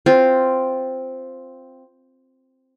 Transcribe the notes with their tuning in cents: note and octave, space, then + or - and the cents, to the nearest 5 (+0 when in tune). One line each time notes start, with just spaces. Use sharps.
C4 +0 F4 +0